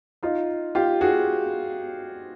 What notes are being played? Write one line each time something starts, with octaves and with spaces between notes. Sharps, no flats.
D#4 F4
F4 G4
F#4 G#4